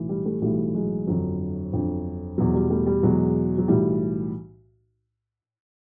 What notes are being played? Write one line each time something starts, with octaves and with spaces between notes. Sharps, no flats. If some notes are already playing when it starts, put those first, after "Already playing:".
Already playing: B1 A2 E3
G3
G3 A3
B1 A2 E3 G3 A3
F#3 G#3
G1 F2 D3 F#3
G1 F2 D3
E2 B2 F#3
G3
G3 A3
G3
E2 B2 F#3 G#3
F#3
B1 A2 E3 G3